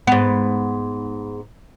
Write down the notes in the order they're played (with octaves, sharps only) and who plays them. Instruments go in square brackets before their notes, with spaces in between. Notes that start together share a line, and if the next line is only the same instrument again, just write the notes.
[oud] G#2 B3